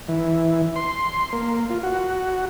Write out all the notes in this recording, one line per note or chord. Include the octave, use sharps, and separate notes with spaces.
E3
C6
A#3
F4
F#4